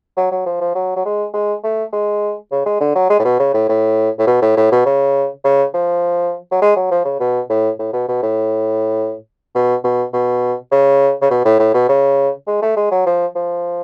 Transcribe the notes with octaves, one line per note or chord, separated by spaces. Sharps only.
F#3
F#3
F3
F3
F#3
F#3
G#3
G#3
A3
G#3
C#3
G#3
D3
F#3
G#3
A2
B2
C#3
A2
A2
A2
B2
A2
A2
B2
C#3
C#3
F3
F#3
G#3
F#3
F3
C#3
B2
A2
A2
B2
B2
A2
B2
B2
B2
C#3
C#3
B2
A2
A2
B2
C#3
G#3
A3
G#3
F#3
F3
F3